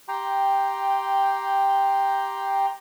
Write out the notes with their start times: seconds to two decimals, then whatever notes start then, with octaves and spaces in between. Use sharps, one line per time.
0.08 G4 G5 A#5 C6